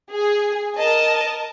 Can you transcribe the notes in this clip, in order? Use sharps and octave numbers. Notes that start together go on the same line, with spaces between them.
G#4
A#4 D#5 A5